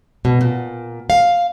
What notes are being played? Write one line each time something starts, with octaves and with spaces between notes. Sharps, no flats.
B2
A#2
F5